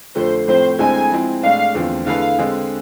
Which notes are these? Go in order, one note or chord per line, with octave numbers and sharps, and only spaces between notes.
F2 D3 F3 A3 C5
A2 F3 A3 C4 C5
D2 D3 G#3 C4 E4 G#5
F3 G#3 C4 E4
A2 G#3 D4 F5
E2 D3 F3 A3 C4
D3 A3 E4 G#4 B4 F5
D3 G#3 C4 G#4